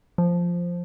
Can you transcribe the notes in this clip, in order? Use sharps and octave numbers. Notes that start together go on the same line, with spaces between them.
F3